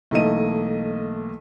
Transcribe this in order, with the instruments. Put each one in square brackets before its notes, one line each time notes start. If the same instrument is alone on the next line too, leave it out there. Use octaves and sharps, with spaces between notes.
[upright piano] B1 E3 A3 A#3 D#5 D#7